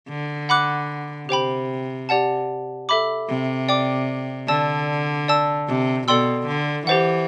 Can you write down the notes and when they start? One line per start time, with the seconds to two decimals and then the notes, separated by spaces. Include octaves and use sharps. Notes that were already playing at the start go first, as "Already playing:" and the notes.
0.09 D3
0.49 F#5 B5 D6 F#6
1.29 C3 G4 C5 G5 B5
2.09 G4 D5 F#5 A5
2.89 A4 E5 B5 D6
3.28 C3
3.69 D5 G5 D6
4.48 D3 D5 A5 E6
5.28 D5 A5 E6
5.68 C3
6.08 B2 A4 D5 G5 C6 E6
6.47 D3
6.87 E3 G4 C5 F#5